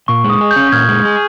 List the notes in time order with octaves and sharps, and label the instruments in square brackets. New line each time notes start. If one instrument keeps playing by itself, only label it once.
[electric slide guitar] A#2 [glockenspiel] C#6
[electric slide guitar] G#3
[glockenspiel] D#6
[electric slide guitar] G#4
[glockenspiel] G6
[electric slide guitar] C#4
[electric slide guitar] A#2 [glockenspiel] F6 G#6
[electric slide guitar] G#3
G#4